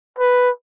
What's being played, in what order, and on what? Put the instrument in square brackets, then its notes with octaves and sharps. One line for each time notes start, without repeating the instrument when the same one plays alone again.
[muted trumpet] B4